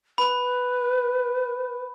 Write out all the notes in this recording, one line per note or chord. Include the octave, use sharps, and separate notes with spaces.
B4 B5